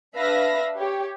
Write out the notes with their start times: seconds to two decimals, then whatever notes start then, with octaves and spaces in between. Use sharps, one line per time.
0.15 D4 B4 E5 F5 B5 A#6
0.77 G4 C#5